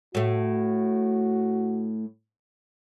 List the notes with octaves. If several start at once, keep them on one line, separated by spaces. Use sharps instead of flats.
A2 A3 F#4